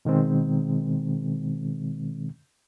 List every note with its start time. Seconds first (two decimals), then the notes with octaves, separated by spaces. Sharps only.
0.05 B2 D#3 G#3 C4